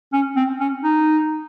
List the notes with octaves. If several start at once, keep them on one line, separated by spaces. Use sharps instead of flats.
C#4
C4
C#4
D#4